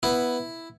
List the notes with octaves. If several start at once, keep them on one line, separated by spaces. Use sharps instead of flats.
B3 E4